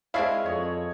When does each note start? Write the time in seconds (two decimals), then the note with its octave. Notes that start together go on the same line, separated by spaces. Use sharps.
0.14 G#3 C4 D4 E4 C#5 D#5 F5
0.46 F2 G#4 C#5